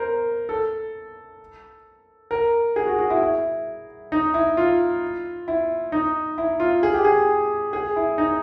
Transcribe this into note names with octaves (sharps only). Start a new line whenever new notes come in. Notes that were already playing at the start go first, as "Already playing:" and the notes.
Already playing: A#4 C5
A4
A#4
G#4
F#4
F#4
E4
E4
D#4
E4
F4
E4
D#4
E4
F4
G#4
G4
G#4
G#4
E4
D#4